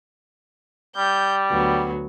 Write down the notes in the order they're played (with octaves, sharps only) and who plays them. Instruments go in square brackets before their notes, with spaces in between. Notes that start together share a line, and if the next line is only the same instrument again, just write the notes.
[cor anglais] G3 [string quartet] G6
[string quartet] D2 F#3 B3